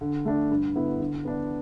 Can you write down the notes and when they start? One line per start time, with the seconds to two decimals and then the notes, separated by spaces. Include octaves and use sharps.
0.01 D3
0.25 A3 D4
0.51 G2
0.75 D3 B3 E4
1.00 D3
1.25 B3 D4